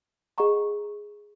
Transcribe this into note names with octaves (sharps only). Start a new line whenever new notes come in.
G#4 D#5 F#5 A#5 C#6